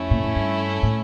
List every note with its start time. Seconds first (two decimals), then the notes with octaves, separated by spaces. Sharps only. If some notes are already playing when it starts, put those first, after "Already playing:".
Already playing: F2 A3 C#4 E4
0.11 A#2
0.23 A2
0.36 G2
0.83 A2